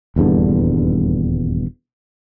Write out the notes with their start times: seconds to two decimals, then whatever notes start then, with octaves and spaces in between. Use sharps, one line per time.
0.16 D#1 E2 G2 D3